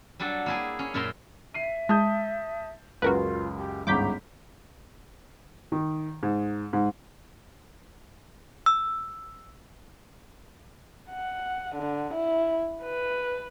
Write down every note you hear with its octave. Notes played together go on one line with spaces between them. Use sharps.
F#3 G3 D4 A4
A#3 E4 G#4
C#4
F#2 A#2 A#4 E5 A#5 C6
E5 C7 D#7
G#3 A5 D#6 G6
C#2 F#2 F4 F#4 A#4 B4
G4
G1 C#2 G#2 A#5 D6 G6 B6
D#3
G#2
G#2
E6
F#5
D3
E4
B4